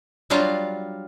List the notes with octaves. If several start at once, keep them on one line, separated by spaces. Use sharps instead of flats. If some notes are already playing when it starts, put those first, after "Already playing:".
F#3 G3 D4 F4 F5